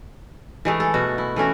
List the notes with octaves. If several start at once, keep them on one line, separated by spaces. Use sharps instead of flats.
E3 G#3 A3
A4
B2 F#4
E4
E3 A3 C#4 F#4